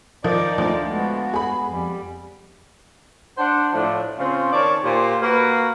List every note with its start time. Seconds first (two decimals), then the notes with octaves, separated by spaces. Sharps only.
0.24 D#3 F3 D#4 D5
0.58 D2 F3
0.88 G#3 B3 F#4
1.34 G#4 B5
1.69 F2 G3
3.38 D4 C5 F#5
3.73 A2 F3 D4
4.18 C#3 C4 C#4 F4
4.53 D#3 C#5 D5 A5
4.83 A#2 G4 C5
5.22 A#3 F#4 B4